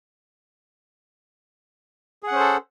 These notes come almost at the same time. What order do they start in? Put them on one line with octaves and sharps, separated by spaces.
G#4 F#5 C#4 C5 A4